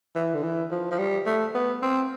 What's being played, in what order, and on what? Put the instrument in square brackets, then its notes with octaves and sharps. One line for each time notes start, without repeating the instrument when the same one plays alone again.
[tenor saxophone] E3
D3
E3
F3
F3
G3
A3
B3
C4